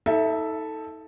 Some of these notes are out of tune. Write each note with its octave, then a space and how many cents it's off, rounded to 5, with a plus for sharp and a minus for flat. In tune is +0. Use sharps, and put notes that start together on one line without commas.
D#4 +35 A4 +0 E5 +0